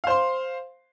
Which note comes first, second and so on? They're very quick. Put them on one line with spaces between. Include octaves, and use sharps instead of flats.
F5 C5 C6